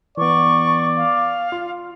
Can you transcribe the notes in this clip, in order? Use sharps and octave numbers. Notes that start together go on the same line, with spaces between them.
E3 B3 D5 C#6
F5
F4